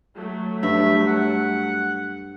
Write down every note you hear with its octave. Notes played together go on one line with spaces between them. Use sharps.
F#3 A3
G2 E5
F#5